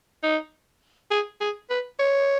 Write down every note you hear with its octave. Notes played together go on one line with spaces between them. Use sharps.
D#4
G#4
G#4
B4
C#5